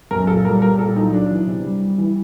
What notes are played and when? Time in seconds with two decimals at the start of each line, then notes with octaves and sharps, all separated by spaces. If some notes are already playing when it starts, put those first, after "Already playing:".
0.11 F#2 A#4
0.27 A#2 A4
0.45 G3 A#4
0.62 G3 A#4
0.79 A#2 A4
0.96 F#3 D#4
1.13 F#3 D4
1.30 E3
1.47 C3
1.64 G3
1.82 G3
1.98 E3